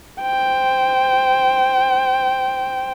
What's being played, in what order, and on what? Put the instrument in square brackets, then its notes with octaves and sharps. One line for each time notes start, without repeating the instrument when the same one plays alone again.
[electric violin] C5 G5